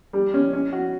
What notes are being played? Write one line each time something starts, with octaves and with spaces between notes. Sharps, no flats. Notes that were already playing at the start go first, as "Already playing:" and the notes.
G3
C#4
C#4
F#4